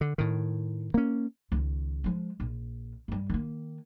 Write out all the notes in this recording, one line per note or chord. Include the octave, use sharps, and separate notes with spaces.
D3
A2 D#3
A#3 C#4
C#2 D#3
F3 G#3
A#1
G2 G3
D#3 A#3